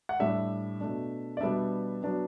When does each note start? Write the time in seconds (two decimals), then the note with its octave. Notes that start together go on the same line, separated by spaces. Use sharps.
0.09 F#5
0.19 A2 G3 D4 E5
0.81 B2 A3 D4
1.37 D5
1.41 B2 G3 B3 D4 E5
2.03 F#3 B3 D4